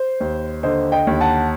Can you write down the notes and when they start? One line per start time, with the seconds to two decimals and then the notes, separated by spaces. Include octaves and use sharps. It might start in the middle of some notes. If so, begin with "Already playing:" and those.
Already playing: C5
0.20 D#2
0.63 D3 C5 D#5
0.92 D#5 G5
1.07 D#2
1.21 F#5 A5